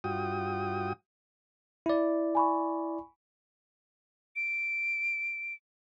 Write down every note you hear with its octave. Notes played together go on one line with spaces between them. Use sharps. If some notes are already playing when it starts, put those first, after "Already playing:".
G2 F4 F#4 G5 D#6
E4 D5
G#5 B5 C#6
D7